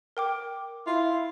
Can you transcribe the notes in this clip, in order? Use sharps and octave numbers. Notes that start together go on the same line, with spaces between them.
A#4 G5 D6
E4 F4